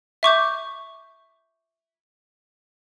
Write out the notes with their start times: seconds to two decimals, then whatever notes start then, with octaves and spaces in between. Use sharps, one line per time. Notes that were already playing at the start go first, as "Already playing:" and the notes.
0.23 E5 C#6 D6 G6